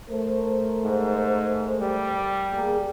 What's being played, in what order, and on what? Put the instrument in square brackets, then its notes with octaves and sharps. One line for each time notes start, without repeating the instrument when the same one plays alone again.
[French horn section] A3 A#4 C5
[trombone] G#2
G3
[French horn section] A#3 G#4